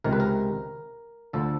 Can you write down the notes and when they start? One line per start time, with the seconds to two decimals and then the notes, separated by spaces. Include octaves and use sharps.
0.04 C#2 C3 D#3 A#4
0.13 B4
0.20 A#4
1.33 D2 D3 F3 A4